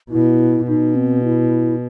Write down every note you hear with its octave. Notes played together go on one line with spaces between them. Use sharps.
B2 E4
B2 D#4
C4
E4